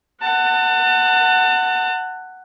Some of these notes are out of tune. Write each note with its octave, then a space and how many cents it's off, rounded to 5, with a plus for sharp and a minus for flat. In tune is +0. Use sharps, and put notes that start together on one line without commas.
F#5 +5 A5 +35